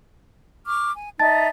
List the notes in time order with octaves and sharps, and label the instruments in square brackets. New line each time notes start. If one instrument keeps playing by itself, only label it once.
[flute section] C#6 D6 F6
G#5
[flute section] D#4 D5 E5 [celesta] A5 A6